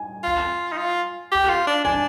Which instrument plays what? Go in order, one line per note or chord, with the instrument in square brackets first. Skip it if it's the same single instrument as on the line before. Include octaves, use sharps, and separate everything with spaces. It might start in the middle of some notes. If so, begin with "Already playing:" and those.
Already playing: [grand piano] G#5
[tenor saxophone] F4
D#4
F4
G4
F4
D4
[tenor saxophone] D4 [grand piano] G#5